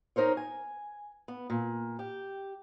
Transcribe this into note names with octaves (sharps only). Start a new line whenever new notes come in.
D#4 A#4 C5 C#5
G#5
B3
A#2
G4